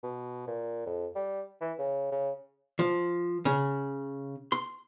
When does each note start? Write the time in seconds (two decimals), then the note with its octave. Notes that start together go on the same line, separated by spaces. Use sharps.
0.03 B2
0.47 A#2
0.87 F2
1.15 G3
1.61 E3
1.79 C#3
2.12 C#3
2.79 F3
3.45 C#3
4.52 C6